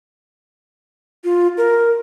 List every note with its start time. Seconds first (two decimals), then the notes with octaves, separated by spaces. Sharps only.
1.24 F4
1.58 A#4